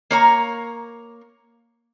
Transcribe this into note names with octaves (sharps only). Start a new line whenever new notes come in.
A#3 C#5 A#5